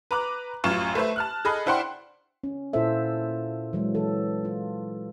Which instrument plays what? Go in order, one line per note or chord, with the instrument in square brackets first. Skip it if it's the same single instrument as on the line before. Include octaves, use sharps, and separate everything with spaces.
[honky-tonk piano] B4 A#5 D6 F#6
A1 F#2 F4 C#6 E7
A3 B4 C5 E5
A5 F6 F#6
G#4 A4 D#5 B5 F#6
D4 E4 C5 F#5 G5 C6
[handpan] C#4
A#2 E4 F4 A4 C5 E5
E3 F#3 G#3
E3 A4
F4